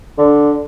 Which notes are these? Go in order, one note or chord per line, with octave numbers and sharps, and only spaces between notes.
D3